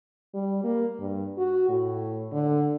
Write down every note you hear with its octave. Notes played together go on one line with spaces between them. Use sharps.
G3
A#3
G2
F#4
A2
D3